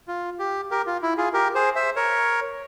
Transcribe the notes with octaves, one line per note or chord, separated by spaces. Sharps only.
F4
G4
G4 A#4
F4
E4
F4 G#4
G4 A#4
G#4 C5
C5 E5
A#4 C#5